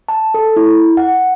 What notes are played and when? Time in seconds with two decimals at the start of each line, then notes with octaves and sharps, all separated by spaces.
0.08 A5
0.34 A4
0.56 E4
0.97 F#5